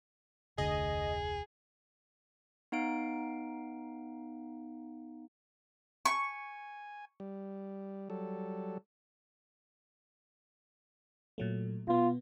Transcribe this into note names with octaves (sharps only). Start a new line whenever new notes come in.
F1 D2 D3 G#4 D#5
B3 D#4 F5 D7
G#5 C#6
G3
F#3 G3 A4
A#2 F#3 A3
B2 B3 F4